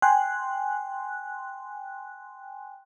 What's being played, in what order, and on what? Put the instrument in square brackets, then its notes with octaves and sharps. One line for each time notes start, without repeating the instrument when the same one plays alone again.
[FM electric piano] G5 G#5 C6 F#6